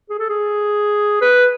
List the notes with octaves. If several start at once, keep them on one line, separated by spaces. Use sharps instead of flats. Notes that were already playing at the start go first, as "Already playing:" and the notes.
G#4
A4
G#4
B4